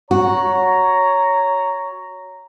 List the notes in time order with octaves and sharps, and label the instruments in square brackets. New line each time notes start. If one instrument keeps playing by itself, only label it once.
[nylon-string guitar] F#4 [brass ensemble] C#5 A#5